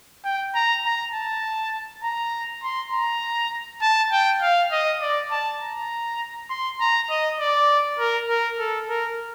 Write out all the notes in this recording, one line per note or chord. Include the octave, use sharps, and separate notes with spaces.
G5
A#5
A#5
A5
A#5
C6
A#5
A5
G5
F5
D#5
D5
A5
A#5
C6
A#5
D#5
D5
A#4
A#4
A4
A#4